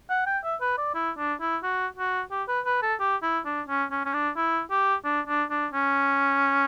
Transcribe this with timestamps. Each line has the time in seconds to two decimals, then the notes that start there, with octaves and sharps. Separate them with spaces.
0.10 F#5
0.26 G5
0.44 E5
0.61 B4
0.78 D5
0.95 E4
1.18 D4
1.41 E4
1.63 F#4
1.97 F#4
2.31 G4
2.48 B4
2.65 B4
2.82 A4
3.00 G4
3.23 E4
3.45 D4
3.68 C#4
3.91 C#4
4.05 C#4
4.14 D4
4.36 E4
4.71 G4
5.04 D4
5.28 D4
5.50 D4
5.73 C#4